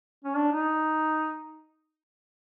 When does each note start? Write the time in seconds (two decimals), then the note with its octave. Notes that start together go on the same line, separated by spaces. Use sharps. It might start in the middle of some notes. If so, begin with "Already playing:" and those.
0.25 C#4
0.36 D4
0.52 D#4